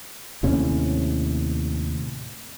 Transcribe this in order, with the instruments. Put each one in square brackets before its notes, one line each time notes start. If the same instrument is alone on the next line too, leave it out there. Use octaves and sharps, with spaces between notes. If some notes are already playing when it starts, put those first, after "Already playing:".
[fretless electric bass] D#2 A2 C3 C#4